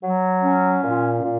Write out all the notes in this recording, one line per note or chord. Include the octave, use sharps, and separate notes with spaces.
F#3
C#4
A#2
A#2